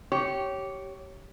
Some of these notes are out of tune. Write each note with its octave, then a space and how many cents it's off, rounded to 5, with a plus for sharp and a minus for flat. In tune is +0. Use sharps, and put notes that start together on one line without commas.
G4 -20 C#5 +0